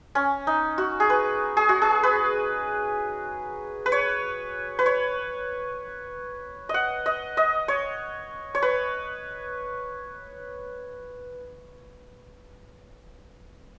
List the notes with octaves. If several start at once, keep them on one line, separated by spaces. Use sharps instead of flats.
C#4
D#4
F#4
G#4
B4
G#4
F#4
G#4
B4
B4
C#5
B4
C#5
D#5 F#5
D#5
D#5
C#5
C#5
B4